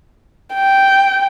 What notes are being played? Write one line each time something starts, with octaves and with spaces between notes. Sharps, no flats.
G5